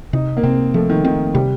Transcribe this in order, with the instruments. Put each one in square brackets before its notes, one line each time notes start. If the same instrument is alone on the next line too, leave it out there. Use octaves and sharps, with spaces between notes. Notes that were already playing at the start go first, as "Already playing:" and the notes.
[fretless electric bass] C3 [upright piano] D#4
[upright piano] A#3
[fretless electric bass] C3 [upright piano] C4
[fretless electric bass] F3 [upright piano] A3
[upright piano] D#3
[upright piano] D#3 [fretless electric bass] C4
[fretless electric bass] C3 [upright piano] G3